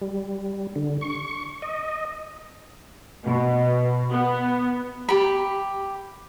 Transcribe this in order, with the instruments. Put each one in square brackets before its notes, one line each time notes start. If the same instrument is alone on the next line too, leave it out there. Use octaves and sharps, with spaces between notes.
[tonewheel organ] G3
D3
C#6
D#5
[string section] B2
B3
[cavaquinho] G4 B5